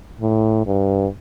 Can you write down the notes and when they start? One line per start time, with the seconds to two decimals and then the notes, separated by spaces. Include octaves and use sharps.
0.21 A2
0.66 G2